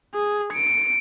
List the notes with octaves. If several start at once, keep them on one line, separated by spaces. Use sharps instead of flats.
G#4
C#7 D7